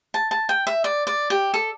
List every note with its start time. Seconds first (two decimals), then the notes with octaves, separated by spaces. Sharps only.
0.14 A5
0.31 A5
0.49 G5
0.67 E5
0.84 D5
1.07 D5
1.30 G4
1.54 A4